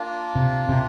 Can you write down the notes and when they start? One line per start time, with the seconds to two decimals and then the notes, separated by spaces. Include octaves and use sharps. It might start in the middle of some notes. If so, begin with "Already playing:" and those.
Already playing: A#3 D4 F4
0.35 C3
0.69 C3